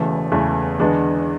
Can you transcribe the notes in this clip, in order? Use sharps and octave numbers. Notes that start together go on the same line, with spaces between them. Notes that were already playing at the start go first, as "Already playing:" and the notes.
Already playing: E1 E2 C#3 E3 A3
E1 E2 C#3 E3 A3
E2 D3 G#3 B3 D4